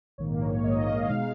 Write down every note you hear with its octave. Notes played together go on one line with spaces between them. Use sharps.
A#1 G#2 D#3 A#3 C#5
C#5
A#1 G#2 D#3 A#3 D#5
F5
B2 G#3 D#4 F5